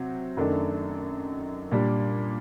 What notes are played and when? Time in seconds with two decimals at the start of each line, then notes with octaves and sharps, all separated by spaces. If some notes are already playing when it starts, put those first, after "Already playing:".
Already playing: C3 F#3 C4
0.37 F#2 D#3 A3 D4
1.72 A#2 G3 D4